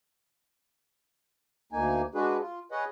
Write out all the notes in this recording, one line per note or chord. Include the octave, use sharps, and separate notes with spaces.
D2 A#3 D#4 G#5
G#3 D4 F#4 G#4 B4
F4
G#4 B4 C#5 D#5 F#5